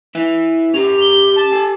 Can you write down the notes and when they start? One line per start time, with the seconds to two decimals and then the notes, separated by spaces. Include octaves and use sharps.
0.15 E4 B4 E5
0.74 C#4 G4 A#4 F7
1.01 G7
1.36 A5
1.52 A4 G#5